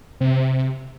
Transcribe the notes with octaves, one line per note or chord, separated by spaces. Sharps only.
C3